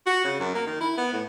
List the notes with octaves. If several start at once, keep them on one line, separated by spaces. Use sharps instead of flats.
F#4
C#3
F#2
A#3
D#3
E4
B3
A2